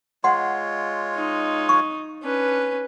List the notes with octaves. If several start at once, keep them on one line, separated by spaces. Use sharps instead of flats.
G#3 F4 C#5 F#5 C6
D#4
C#6
C#4 D4 B4